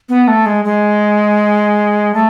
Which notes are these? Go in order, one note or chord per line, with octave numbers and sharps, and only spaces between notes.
B3
A3
G#3
G#3
A3